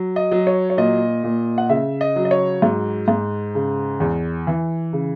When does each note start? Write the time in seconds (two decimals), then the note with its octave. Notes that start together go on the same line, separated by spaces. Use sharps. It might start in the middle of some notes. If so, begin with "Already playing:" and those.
Already playing: F#3
0.16 D#5
0.31 F#3
0.47 C#5
0.70 C#5
0.77 A#2 D#5
1.24 A#2
1.58 F#5
1.69 C#3 E5
2.01 D#5
2.16 F#3
2.25 D#5
2.31 C#5
2.62 G#2
3.08 G#2
3.55 C#3
4.00 E2
4.47 E3
4.93 C#3